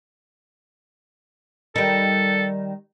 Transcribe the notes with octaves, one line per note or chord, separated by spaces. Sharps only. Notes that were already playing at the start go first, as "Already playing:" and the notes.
D#3 G3 A4